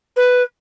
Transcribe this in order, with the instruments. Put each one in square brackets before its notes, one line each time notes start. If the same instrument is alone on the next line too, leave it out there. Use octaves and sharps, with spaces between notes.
[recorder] B4